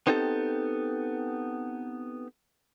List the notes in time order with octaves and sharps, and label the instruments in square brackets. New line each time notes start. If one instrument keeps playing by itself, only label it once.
[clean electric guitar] B3 C4 D#4 G4 A4